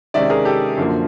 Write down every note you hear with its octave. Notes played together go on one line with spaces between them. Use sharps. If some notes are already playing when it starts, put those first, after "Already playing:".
C3 D#3 G#3 C#4 D5 E5
G#4 A#4
G4 A4
F#2 D3 F3 A#3